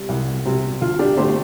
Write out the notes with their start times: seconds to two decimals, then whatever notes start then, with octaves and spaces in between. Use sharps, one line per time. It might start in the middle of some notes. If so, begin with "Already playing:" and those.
Already playing: C3 G3
0.09 C2
0.45 C3 G3
0.81 D2 F4
0.99 D4 G4
1.17 D3 A3 G4 C5